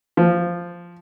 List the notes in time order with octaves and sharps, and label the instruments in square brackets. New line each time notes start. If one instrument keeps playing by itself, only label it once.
[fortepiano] F3